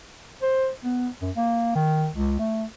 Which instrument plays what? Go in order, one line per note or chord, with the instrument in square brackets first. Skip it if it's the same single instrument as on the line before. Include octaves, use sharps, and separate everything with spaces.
[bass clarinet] C5
B3
F#2
A#3
D#3
C#2
A3